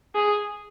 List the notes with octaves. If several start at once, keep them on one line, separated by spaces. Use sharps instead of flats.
G#4